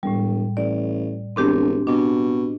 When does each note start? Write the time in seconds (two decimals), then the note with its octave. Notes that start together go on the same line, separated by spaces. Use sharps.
0.03 E1 A2 G3
0.57 A1 D5
1.36 E1 C4 D4 G4
1.87 B2 D4